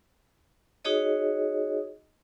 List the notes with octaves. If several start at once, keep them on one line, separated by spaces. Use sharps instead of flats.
D#4 F#4 G#4 C#5 D#5